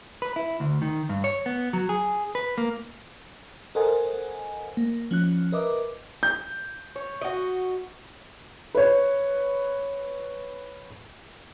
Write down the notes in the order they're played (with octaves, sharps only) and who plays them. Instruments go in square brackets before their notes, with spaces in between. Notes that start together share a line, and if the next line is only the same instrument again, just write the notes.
[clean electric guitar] B4
E4
D2
D#3
G2
C#5
B3
F#3
G#4
B4
A#3
[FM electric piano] A4 A#4 C5 D#5 F#5 G#5
A#3
F3 C#4 F#6
A#4 B4 D#5 E5 D6
[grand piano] G6
[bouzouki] C#5
F#4 D#5
[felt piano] B4 C#5